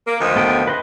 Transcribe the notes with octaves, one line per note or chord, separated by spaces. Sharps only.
A#3
D2 D#3 F3
B3 A4 G5
B4 D#5 C6